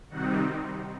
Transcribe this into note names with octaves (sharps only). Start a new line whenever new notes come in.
C3 D#3 G3 C4 D#4 F#4 F#5